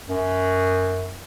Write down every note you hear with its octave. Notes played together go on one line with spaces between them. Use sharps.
F#2